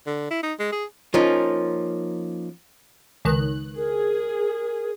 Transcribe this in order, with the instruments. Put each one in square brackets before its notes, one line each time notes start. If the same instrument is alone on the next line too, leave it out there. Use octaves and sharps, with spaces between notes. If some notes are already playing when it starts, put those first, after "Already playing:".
[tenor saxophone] D3
E4
D#4
G#3
G#4
[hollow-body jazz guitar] F3 A#3 C#4 D#4 F4
[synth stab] C#2 D#3 F#6
[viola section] G#4 [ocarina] A#4